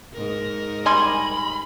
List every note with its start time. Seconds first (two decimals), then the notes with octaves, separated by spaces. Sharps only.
0.13 G#2 A#4
0.86 G3 G#5 B5 C6